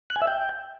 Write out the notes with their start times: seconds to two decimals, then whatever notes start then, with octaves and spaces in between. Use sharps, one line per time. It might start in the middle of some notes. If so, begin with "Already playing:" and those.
0.10 F#6
0.16 G#5
0.22 E5
0.27 G5